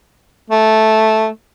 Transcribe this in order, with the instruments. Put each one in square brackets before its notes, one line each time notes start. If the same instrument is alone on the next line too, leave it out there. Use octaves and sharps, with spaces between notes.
[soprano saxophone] A3